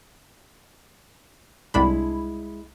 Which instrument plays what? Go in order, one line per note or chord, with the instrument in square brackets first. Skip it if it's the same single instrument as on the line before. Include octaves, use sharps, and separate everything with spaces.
[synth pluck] C2 D4 B5 [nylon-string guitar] G#3 E4